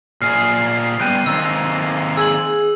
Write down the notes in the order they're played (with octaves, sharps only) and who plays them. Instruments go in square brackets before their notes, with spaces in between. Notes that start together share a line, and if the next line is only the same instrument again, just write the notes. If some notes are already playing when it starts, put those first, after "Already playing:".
[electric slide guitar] A#2 G#4 [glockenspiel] F6 [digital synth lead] C7
[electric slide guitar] G3 B3 G5 [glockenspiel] F#6 G6 D#7
[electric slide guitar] D#3 A#3 C4 [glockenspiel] E6
[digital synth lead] G#4 [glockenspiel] E6 F#7